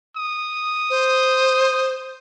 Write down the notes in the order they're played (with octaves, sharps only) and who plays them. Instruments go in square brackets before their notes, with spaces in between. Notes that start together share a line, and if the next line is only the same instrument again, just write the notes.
[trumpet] D#6
[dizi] C5